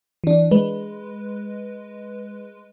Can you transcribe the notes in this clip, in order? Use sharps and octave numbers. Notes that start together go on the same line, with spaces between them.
E3 D4
G#3 B4